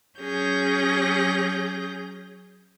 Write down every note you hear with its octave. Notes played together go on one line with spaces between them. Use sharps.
F#3 C#4 G#4 G6 A#6